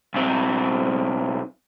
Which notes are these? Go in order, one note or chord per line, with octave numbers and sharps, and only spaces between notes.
B1 C4